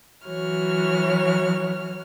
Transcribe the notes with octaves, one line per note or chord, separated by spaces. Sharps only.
E3 F#3 F#4 C#5 F6